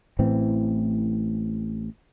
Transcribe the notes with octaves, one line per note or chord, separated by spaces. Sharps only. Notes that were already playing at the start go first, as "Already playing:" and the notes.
A1 A2 E3 C4